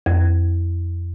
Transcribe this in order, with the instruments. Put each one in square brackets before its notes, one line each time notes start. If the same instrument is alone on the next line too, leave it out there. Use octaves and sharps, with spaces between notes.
[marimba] F2